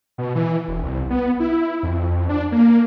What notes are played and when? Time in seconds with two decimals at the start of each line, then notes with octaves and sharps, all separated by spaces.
0.18 B2
0.35 E3
0.68 E1
0.83 C2
1.10 B3
1.40 E4
1.83 F2
2.29 D4
2.52 A#3